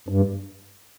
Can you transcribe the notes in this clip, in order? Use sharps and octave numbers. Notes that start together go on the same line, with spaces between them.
G2